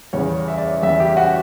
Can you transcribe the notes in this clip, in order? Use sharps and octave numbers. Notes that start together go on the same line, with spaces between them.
E2 C#3 G3 C#5
E5
D5
E5
E2 C#3 G3 E5
G4
F#4